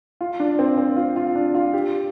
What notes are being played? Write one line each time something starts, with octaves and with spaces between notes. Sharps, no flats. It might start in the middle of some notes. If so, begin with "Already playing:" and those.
F4
D4
C4
C4
F4
F4
D4
F4
G4